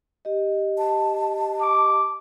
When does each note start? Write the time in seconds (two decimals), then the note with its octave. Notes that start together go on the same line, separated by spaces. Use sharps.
0.25 G4 D#5
0.78 A5
1.61 D6